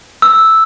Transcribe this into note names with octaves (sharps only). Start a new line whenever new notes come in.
E6